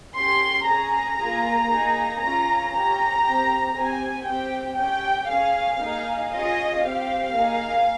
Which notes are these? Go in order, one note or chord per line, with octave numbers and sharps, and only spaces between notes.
C#4 G4 C6
C#4 G#4 A#5
A#3 F4 G#4
A#3 D#4 G#4
C#4 F4 G#4 A#5
C#4 G4 A#5
C4 G4
C4 G4 G#5
C4 G4 G5
C#4 G4 G5
C#4 G#4 F5
A#3 D#4 G#4
C#4 F4 G#4 D#5
C4 G4 F5
A#3 D#4 G#4